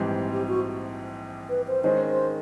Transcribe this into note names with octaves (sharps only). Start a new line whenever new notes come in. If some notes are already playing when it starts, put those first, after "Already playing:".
Already playing: A#1 G#2 E3 G3 C4
G4
F#4
B4
C5
D#3 G#3 C#4 C5
C5